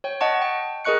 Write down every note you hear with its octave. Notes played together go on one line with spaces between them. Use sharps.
C#5 G5
D#5 F#5 A5 C#6
G5
G#4 A#4 D#5 C#6 F#6 C#7